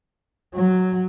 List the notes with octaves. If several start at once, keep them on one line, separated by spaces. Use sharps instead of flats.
F#3